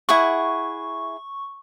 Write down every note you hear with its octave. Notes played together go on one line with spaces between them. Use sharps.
E4 G#4 F#5 C#6